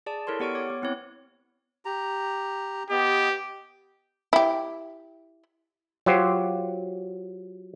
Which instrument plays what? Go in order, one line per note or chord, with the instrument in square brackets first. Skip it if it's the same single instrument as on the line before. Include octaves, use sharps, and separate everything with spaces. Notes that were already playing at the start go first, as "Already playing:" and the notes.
[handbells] G#4 D5 A5
E4 A4 A#4 C#5 C6
B3 G4 D5 C#6 D7
C#5 D6
B3
B3 C4 E4 C#5
[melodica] G4 A#5
[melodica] B3 D#5 [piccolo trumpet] G4
[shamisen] E4 G4
[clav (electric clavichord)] F#3 F4 G4 C5